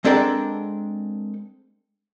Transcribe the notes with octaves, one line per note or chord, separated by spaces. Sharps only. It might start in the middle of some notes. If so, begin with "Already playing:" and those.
G#3 C4 D4 A4 A#4 F#5